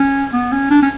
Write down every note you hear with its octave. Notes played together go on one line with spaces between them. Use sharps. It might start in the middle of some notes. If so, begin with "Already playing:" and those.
Already playing: C#4
B3
C#4
D4
C#4